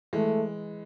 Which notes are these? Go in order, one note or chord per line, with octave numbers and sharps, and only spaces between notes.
E3 G#3 A3